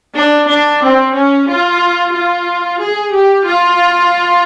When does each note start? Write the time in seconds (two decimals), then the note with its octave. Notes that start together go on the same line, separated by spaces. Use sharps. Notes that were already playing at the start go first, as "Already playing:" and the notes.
0.15 D4
0.48 D4
0.81 C4
1.14 C#4
1.48 F4
2.14 F4
2.80 G#4
3.13 G4
3.46 F4